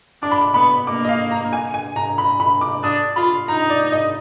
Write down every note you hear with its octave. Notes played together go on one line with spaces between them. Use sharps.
D4 D6
B5
D6
B3 B5
A#3 D6
D#5
F5
A#5
G#5
G#5
A#5
B5
B5
D6
D4 D#6
F4 B5
D#4 A#5
D5
D#5